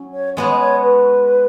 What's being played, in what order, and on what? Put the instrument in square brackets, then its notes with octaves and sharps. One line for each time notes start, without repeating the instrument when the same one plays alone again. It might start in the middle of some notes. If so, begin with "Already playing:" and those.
Already playing: [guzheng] F#3 C#4
[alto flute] C#5
[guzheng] G#3 B3 F#4 [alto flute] C#5
[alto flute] D#5
C#5
B4